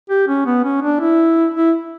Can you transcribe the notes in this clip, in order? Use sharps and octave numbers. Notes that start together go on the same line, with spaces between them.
G4
C#4
B3
C#4
D4
E4
E4